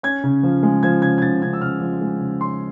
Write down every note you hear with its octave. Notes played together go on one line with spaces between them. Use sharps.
C#4 G#6
C#3
F3
G#3
F3 G#6
C#3 G#6
G#6
C#3 A6
C#3 G#6
E6
C#3 F6
F3
G#3
C#3
C#4 C6